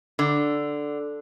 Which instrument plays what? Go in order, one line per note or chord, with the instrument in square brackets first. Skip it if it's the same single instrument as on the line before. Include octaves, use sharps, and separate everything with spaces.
[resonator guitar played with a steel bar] D3